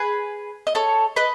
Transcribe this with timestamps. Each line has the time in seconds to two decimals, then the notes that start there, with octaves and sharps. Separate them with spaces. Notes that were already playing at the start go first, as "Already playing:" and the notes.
Already playing: G#4 B4
0.67 D#5
0.75 A4 C#5
1.16 B4 D#5